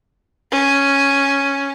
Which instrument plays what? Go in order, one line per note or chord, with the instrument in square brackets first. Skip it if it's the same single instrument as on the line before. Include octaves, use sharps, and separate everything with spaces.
[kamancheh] C#4